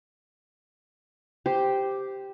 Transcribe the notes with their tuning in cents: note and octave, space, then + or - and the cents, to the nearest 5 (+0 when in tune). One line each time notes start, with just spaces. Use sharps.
G4 +0 C5 -10